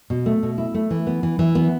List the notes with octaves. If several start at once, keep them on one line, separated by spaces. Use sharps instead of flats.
B2
A3
B2
E4
A3
E3
B3
E3
E3
B3